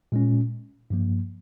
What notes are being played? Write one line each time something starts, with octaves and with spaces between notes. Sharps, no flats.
A#2 G#3 C#4
G2 F3 A#3